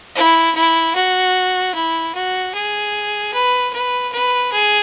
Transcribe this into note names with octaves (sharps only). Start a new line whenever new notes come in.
E4
E4
F#4
E4
F#4
G#4
B4
B4
B4
G#4